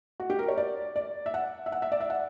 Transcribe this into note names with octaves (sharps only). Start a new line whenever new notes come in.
F#4
G4
A#4
C#5
D5
D5
E5
F#5
E5
F#5
E5
D5
E5
F#5